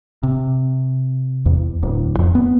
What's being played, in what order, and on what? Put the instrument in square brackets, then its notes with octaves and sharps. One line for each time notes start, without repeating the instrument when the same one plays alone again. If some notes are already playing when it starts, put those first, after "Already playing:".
[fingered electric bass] C3
E2
D1
F2
B3